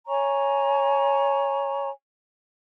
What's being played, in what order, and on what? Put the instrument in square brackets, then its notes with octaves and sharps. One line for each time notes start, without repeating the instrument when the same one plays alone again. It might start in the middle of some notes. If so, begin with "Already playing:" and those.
[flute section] C#5 G#5 A#5 C#6